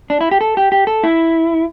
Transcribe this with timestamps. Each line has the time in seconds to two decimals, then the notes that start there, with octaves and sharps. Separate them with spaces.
0.10 D4
0.21 E4
0.31 G4
0.41 A4
0.57 G4
0.72 G4
0.87 A4
1.03 E4